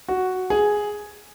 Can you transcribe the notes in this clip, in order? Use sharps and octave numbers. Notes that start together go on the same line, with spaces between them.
F#4
G#4